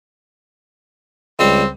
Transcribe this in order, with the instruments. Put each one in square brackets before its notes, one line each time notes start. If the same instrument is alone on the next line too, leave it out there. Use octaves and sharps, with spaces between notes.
[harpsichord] C#2 G3 G4 [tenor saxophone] C4